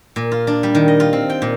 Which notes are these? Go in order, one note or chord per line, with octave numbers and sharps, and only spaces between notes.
A#2
F4
D4
G3
D#3
D#5
F4
C4
G5
A#2